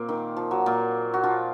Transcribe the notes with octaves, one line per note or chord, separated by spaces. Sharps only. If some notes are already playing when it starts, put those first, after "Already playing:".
Already playing: A#2 A#3 C4 F4
D#3
F3
F#3
A#2 A#3
F#4
F3 F4